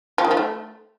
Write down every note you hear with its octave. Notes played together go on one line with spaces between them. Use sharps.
F3
D#3
F3
A3